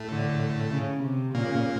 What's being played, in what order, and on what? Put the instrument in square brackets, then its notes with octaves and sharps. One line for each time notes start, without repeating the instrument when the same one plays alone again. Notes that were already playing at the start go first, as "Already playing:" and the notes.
Already playing: [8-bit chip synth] A2 A3
[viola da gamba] D3
C#3
C3
[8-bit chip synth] A#2 A#3 [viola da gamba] C#3